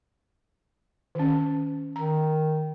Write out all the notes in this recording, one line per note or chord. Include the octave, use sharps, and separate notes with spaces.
D#3 C#4
D#3 A#5